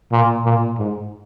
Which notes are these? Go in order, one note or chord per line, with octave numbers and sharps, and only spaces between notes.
A#2
A#2
G#2